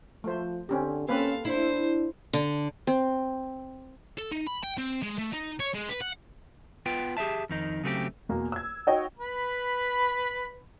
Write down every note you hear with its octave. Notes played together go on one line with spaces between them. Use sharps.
F3 A3 C5
D3 C4 C#4 G4
A#3 C4 C#4 A4 B4 F5
D4 E4 C5
D3
C4
A4
D#4
B5
G5
C4
G#3
A3
D#4
C#5
G#3
B4
F#5
B3 F4 B4 G5
G4 G#4 C#5 E5 A5
F2 D#3 D#4
C#3 F#3 A3 C4 F4 G4
E2 B2 A#3
E6 G#6
D#4 F#4 C#5 D#5 G5
B4 B5